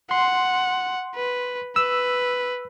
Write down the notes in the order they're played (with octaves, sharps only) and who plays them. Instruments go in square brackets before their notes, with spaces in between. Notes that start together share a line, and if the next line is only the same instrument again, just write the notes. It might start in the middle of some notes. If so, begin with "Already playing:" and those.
[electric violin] F#5 [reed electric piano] C6
[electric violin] B4
[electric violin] B4 [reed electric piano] E6